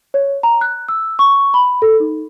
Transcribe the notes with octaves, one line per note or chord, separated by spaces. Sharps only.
C#5
A#5
F#6
E6
C#6
B5
A4
D#4